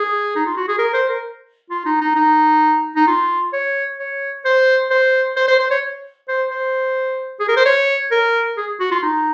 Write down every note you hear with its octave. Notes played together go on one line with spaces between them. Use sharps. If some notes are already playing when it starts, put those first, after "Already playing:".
Already playing: G#4
D#4
F4
F#4
G#4
A#4
C5
A#4
F4
D#4
D#4
D#4
D#4
F4
C#5
C#5
C5
C5
C5
C5
C5
C#5
C5
C5
G#4
A#4
C5
C#5
A#4
G#4
F#4
F4
D#4